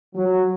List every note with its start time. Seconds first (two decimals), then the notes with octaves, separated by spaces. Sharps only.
0.15 F#3